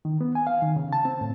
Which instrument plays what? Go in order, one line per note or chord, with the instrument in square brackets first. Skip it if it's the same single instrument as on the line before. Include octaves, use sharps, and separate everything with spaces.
[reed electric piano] D#3
B3
G#5
F5
D#3
C#3
A5
C4
A2